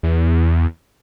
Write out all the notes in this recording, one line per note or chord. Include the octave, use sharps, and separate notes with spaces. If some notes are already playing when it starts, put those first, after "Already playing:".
E2